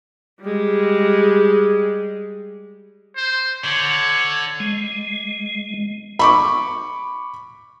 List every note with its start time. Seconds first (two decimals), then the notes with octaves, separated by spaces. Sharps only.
0.41 G3 G#3
3.16 C5
3.64 D3 C#5
4.60 G#3
6.19 B5 C#6 D6